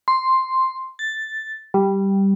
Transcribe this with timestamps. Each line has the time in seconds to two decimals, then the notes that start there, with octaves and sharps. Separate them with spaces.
0.08 C6
0.99 A6
1.74 G3